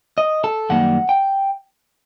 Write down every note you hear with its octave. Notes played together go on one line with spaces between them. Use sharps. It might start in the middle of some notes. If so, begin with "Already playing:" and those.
D#5
A4
F#2 D#3 G3 A#3 F#5
G5